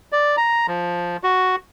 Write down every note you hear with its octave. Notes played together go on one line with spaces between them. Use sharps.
D5
A#5
F3
F#4